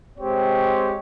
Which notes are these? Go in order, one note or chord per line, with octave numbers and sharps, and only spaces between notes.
G#3 C4 G4 C#5